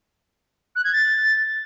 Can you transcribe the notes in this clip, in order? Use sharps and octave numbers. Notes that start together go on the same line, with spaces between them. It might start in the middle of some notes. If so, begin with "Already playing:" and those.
F#6
G#6
A6